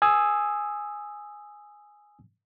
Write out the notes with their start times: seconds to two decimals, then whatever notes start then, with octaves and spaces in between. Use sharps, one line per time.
0.02 G#5 D#6 E6